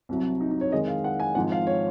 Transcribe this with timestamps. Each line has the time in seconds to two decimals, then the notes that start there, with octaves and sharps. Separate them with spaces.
0.09 C2 C3 F#3
0.41 D#4
0.51 D#4
0.61 C#5
0.72 F2 D#3 G#3 D#5
0.88 F5
1.04 F#5
1.20 G#5
1.35 G#1 G#2 F3 F#5
1.52 F5
1.67 C#5